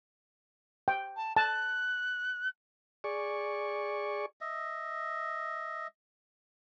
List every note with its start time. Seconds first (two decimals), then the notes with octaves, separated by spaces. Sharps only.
0.88 G5
1.16 A5
1.37 A5 F#6
3.04 G#4 D5 C#6
4.41 D#5 E5